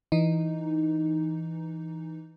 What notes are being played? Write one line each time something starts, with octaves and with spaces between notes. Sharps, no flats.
E3 D#4